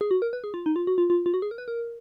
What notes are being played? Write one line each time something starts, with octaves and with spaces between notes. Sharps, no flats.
G#4
F#4
A#4
B4
G#4
F4
D#4
F4
F#4
F4
F4
F4
F#4
G#4
A#4
B4
A#4